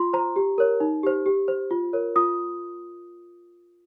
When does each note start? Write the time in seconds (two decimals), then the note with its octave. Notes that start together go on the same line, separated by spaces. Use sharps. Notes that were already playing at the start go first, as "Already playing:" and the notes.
Already playing: F4 C6
0.13 C5 A#5
0.36 G4
0.58 A#4 C#5
0.80 D#4
1.03 G4 C5
1.26 G4
1.48 C5
1.71 F4
1.93 A#4 C#5
2.16 F4 D#6